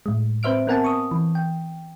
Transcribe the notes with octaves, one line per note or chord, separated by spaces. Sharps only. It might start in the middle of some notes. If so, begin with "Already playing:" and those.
A2 G#3
C4 B4 C5 E5 F6 D7
B3 C4 A#4 F#5 G#5 A5
C#6 D#6
E3
G5